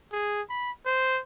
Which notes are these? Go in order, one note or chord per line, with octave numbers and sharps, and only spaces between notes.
G#4
B5
C5